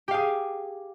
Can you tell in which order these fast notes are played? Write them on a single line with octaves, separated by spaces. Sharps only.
G4 F5 G#4